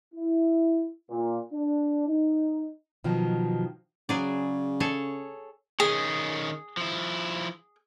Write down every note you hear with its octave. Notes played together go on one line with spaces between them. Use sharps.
E4
A#2
D4
D#4
B2 D#3 F3 F#3
C#3 F#3 G#4 D5
G#4 A4 C#5
D#3 C#4 G#4
F3 E4